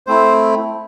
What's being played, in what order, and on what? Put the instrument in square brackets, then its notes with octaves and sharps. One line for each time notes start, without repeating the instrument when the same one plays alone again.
[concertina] A3 C4 E4 C5